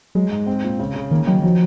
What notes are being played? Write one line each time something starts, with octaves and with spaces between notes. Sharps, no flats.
F#3 G#3
G#2
C4
A#2
C#3
C#3
D#3 A#3
D#3 F#3
F3 F#3